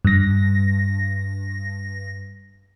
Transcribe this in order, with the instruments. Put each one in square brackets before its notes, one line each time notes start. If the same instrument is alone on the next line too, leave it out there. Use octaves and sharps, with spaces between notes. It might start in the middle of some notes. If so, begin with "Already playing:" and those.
[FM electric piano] G2 A#6